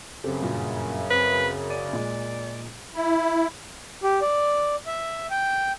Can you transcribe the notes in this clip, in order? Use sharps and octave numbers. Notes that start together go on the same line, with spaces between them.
F#2 C#3 C4 G4 A4
G2 A#2 F#4
C4 B4
D5 D#7
A#2 G#3
E4
G4
D5
E5
G5